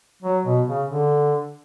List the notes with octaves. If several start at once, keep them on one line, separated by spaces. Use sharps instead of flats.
F#3
B2
C#3
D3